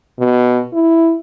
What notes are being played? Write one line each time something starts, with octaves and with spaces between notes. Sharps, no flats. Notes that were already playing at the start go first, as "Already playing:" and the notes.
B2
E4